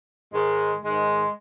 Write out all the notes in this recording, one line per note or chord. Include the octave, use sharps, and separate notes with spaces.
G#2 D#3 G#3
G#2 D#3 G#3